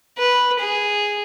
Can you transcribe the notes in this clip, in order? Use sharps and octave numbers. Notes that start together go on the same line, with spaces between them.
B4
G#4